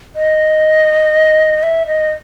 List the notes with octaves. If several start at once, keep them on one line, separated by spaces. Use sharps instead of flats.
D#5
E5
D#5